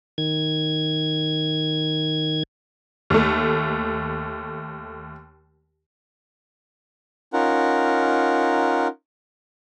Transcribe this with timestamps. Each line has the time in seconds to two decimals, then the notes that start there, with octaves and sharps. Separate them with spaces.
0.18 D#3 G#6
3.10 D#2 A3
7.33 C#4 D#4 F4 A#4 F#5